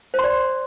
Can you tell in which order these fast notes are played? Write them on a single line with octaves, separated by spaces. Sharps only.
C5 C6 D5